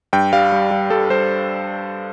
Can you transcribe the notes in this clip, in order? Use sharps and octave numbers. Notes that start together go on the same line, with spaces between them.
G2 G5
G3 F5
G3
G3
G3 A4
G3 C5